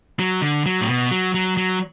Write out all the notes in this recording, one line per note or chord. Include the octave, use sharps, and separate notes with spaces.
F#3
D3
F#3
A2
B2
F#3
F#3
F#3